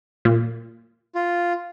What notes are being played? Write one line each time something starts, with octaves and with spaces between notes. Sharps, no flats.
A#2
F4